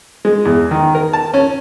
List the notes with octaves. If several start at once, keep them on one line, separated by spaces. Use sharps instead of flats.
G#3
E2
D#3
A#4
A5
C#4